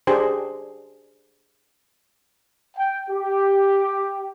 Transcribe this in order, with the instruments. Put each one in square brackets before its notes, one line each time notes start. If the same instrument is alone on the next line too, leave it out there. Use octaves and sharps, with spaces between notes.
[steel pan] D4 G4 G#4 C5
[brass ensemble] G5
G4